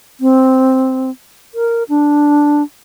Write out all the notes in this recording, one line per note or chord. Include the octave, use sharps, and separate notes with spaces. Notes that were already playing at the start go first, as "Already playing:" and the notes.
C4
A#4
D4